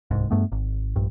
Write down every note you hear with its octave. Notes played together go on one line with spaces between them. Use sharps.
D1 C2 G#2
G2 A3 B3
G#1
A#1 G2